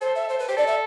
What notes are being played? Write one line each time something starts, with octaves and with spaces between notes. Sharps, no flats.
A4 C5
E5
C5
B4
G4 C5
A4 D5
E5